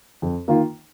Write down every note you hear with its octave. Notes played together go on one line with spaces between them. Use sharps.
F2
D#3 A#3 F4